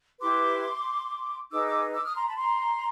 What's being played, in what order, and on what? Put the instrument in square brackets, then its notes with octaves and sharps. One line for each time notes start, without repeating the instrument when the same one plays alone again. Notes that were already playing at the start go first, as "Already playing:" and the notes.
[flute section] E4 G4 B4 C6 D6
D#4 G#4 B4 D6 E6
D6 E6
D6 E6
D#6 F6
A#5 C6
A5 B5
A#5 C6